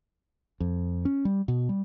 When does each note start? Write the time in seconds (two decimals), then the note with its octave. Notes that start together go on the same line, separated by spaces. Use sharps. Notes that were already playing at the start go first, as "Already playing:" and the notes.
0.60 F2
1.05 C#4
1.25 G3
1.48 B2
1.69 G3